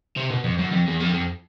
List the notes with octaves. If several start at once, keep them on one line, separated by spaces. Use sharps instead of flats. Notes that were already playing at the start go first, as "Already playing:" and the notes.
C3
B2
F2
F#2
F2
E2
F2
F2